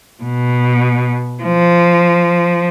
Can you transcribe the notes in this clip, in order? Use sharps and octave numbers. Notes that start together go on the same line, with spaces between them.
B2
F3